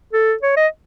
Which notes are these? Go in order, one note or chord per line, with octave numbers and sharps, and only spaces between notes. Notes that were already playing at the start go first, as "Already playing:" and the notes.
A4
C#5
D#5